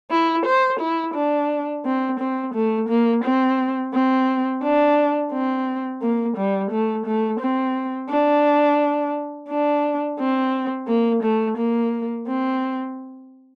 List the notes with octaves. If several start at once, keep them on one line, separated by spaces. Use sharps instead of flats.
E4
C5
E4
D4
C4
C4
A3
A#3
C4
C4
D4
C4
A#3
G3
A3
A3
C4
D4
D4
C4
A#3
A3
A#3
C4